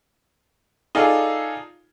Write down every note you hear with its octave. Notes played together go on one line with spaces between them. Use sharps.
D#4 F4 G#4 A4 D5